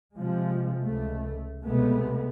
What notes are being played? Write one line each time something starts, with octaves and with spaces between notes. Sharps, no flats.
C3 F3 G#3
C#2 A3
B1 C3 G#3 A3 B3